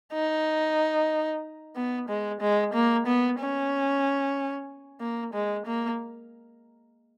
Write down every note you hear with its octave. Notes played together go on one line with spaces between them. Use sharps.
D#4
B3
G#3
G#3
A#3
B3
C#4
A#3
G#3
A#3